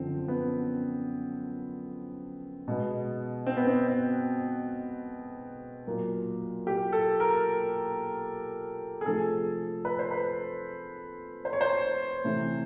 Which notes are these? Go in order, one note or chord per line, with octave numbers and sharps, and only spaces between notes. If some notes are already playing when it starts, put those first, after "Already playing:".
Already playing: F#2 D3 F3 C4
B3
B2 G#3 B3
C4
B3
C4
C4
A#2 F#3 A#3
G4
A4
A#4
G#4
C3 F3 A3 A4
B4
C5
B4
C5
C#5
C5
C3 E3 A3